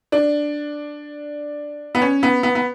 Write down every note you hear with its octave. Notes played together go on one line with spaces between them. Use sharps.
D4
B3
C#4
B3
B3
B3